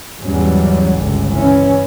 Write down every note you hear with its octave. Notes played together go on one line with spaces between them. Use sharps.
E2 G#2 F#3 G3 C#4
G1 C#2 G2
E3 C#4